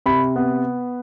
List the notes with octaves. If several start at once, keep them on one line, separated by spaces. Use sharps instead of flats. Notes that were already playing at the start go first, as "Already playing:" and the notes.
C3 B5
B3